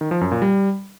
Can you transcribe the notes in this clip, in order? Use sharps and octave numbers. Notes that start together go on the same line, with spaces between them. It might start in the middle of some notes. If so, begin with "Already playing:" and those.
D#3
F3
F#2
A#2
G3